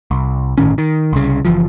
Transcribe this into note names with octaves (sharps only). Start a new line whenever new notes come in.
C2
G1 A2 D#3 C#4
D#3
C2 C#3
F#1 E3 F3